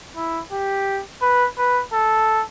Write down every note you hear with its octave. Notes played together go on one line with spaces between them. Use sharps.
E4
G4
B4
B4
A4